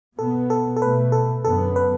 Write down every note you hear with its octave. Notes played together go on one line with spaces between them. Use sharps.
B2 B3 A4
A4
A4
B2 A3 B4
A4
F#2 D3 B3 A4
B4